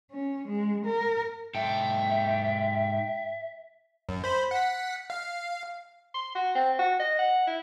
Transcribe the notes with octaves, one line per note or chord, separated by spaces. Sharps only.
C#4
G#3
A#4
G#2 A4 E5 G5
F#2
C5 B5
F#5 B6
F5
C6
F#4
C4
F#4
D#5
F#5
E4